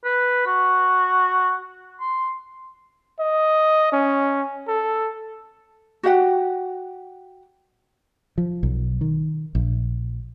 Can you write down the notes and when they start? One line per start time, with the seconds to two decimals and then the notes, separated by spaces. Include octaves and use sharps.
0.04 B4
0.46 F#4
2.00 C6
3.20 D#5
3.92 C#4
4.68 A4
6.03 F#4 G4 F#5 G5
8.38 F3
8.63 B1
9.01 D#3
9.55 A#1